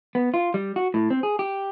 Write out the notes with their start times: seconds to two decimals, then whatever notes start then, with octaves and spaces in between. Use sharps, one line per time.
0.15 B3
0.34 F4
0.54 G3
0.76 F#4
0.94 A2
1.10 C4
1.23 G#4
1.39 G4